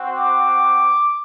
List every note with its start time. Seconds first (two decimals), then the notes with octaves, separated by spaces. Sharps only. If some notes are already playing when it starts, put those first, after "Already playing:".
Already playing: C4 F#4
0.15 D6